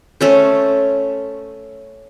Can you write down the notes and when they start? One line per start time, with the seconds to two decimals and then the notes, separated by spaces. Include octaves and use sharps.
0.21 A3 C#4 C5